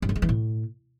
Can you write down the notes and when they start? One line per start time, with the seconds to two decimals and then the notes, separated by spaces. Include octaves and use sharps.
0.02 G2
0.09 D3
0.16 G#3
0.22 E3
0.29 A2